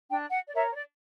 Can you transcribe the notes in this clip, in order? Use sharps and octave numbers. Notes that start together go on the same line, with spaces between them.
D4 G5
F#5
D5
A#4 C#5 E5
C#5
D5